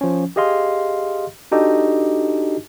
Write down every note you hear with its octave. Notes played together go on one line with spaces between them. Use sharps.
F3 C#4
G4 G#4 D#5 F5 C6
D4 D#4 F#4 G4 A4 D#5